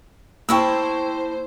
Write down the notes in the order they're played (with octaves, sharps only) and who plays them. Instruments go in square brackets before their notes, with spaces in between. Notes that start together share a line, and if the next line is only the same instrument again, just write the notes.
[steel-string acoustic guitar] A#3 E4 A5 [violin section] C5 [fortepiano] G5 C#6 E6